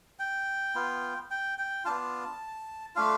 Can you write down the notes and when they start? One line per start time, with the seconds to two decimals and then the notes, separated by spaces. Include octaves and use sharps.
0.19 G5
0.75 B3 F4
1.31 G5
1.58 G5
1.85 B3 D4 F4 A5
2.96 A3 D4 F4 F5